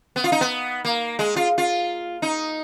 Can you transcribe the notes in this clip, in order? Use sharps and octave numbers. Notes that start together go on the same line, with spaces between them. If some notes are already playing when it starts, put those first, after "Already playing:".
B3
F4
D#4
B3
A#3
G#3
F4
F4
D#4